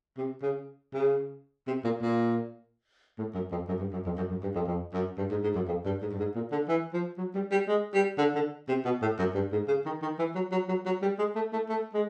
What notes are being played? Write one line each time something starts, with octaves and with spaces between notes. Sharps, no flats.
C3
C#3
C#3
C3
A#2
A#2
A2
F#2
F2
F#2
G2
F#2
F2
F#2
F#2
G2
F2
F2
F#2
G2
G#2
G#2
F#2
F2
G2
G#2
G2
G#2
A#2
D3
E3
F3
F#3
G3
G3
G#3
G3
D3
D3
C3
B2
A2
F#2
G2
G#2
C#3
D#3
D#3
E3
F#3
F#3
F#3
F#3
G3
G#3
A3
A3
A3
G#3